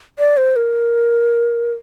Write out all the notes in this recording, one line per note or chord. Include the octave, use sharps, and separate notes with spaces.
D5
C5
A#4